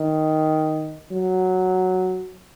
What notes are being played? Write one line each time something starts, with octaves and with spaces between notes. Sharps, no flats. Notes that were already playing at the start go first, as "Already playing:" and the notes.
Already playing: D#3
F#3